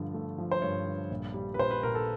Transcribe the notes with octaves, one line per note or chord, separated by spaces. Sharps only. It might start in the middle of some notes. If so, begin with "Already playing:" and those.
Already playing: G2 D3 F3 A3
A3
F3
C5
G2 C#5
D3
A#1
G3
B4
A#1 C5
B4
A#2 A#4
A4